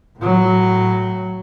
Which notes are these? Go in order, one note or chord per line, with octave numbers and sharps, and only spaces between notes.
A2 F#3